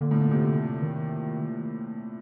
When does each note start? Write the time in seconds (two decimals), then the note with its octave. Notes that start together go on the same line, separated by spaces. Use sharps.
0.01 A#2 D3
0.11 A2
0.21 A#2
0.31 C3
0.82 D#3